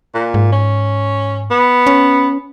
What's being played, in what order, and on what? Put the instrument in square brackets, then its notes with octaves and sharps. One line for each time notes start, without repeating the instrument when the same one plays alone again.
[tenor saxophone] A#2
[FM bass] G#2
[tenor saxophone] C#4
B3
[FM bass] C#4